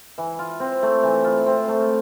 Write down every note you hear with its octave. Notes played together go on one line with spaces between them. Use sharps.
E3
F4
C4
A3
E3
F4
C4
A3